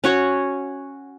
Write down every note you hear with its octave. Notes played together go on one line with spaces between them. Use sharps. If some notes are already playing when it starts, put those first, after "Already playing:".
C#4 F#4 C#5